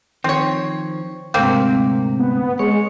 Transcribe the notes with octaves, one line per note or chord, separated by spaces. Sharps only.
D#3 F3 C4 C#5
D2 G#2 C3 A#3 C4
B3
G#3 C#5